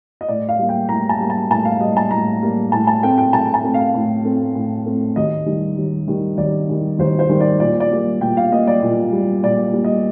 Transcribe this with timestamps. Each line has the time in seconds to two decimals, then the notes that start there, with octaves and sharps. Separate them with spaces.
0.21 D#5
0.29 A2 D5
0.49 F5
0.59 G3 A#3
0.69 G5
0.89 A2 A#5
1.09 A5
1.20 G3 A#3
1.30 A5
1.51 A2 A5
1.65 F5
1.80 G3 A#3 D#5
1.97 A5
2.11 A2 A#5
2.42 G3 A#3
2.72 A2 A5
2.87 A5
3.03 A3 C4 G5
3.18 G5
3.33 A2 A5
3.54 A5
3.64 A3 C4
3.74 F5
3.94 A2
4.25 A3 C4
4.55 A2
4.86 A3 C4
5.16 D#2 D#5
5.46 D#3 G3
5.77 D#2
6.08 D#3 G3
6.38 D#2 D5
6.69 D#3 G3
6.99 D#2 C5
7.19 C5
7.29 D#3 G3
7.40 D5
7.60 A#2 D5
7.80 D5
7.91 G3 A#3
8.21 A#2 G5
8.37 F5
8.52 G3 A#3 D#5
8.68 D5
8.83 A#2
9.13 G3 A#3
9.43 A#2 D5
9.73 G3 A#3
9.84 D#5